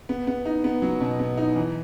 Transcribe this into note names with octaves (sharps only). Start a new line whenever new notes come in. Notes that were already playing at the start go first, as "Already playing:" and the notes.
B3
B3
D#4
B3
F#3
B2
B3
D#4
E3